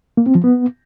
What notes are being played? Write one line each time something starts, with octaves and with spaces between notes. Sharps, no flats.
A#3
C4
F3
B3